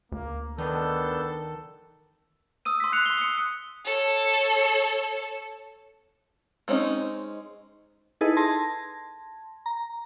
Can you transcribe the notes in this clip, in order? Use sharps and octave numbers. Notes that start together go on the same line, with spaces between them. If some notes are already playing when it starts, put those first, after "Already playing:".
D2 A#3
D#3 B3 D4 A4 G6
D#6 E6 D#7
C6 B6
F#6 C7 C#7 F7
C6 G7
D#6 C#7
A4 C#5
G#3 C4 C#4 D#4
D#4 E4 G#4 A4 B4 D#5
A5 C6 G#6 A#6
A#5